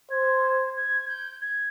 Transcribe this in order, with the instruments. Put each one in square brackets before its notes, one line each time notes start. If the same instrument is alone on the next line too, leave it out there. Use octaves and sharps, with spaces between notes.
[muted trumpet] C5 [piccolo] G#6
[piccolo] G#6
G6
G#6